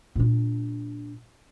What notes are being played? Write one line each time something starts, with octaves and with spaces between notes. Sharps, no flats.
A#2 D4